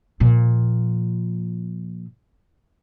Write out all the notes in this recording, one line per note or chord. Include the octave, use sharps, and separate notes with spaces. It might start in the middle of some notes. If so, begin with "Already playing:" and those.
A#2 F3